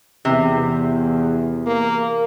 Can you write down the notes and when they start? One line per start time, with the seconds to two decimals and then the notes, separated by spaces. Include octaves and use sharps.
0.25 E2 C3
1.66 A#3